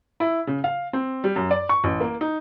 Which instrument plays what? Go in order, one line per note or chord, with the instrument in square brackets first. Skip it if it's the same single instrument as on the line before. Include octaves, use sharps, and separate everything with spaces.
[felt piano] E4
C#3
F5
C4
G3
F#2
D5
C#6
A1
A#3
D#4